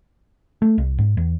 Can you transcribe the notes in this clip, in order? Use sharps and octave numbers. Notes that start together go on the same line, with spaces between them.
A3
C2
G#2
E2